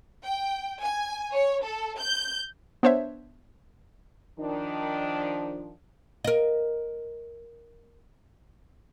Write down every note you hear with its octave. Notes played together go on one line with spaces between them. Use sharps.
G5
G#5
C#5
A4
G6
B3 D4 C5 C#5 E5
D#3 F3 D4
A#4 D#5